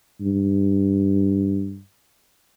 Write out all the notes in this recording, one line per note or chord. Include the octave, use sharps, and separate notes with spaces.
G2